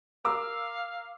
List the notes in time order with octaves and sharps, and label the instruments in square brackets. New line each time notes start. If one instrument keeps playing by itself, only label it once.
[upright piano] A#4 D6 E6 [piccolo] F5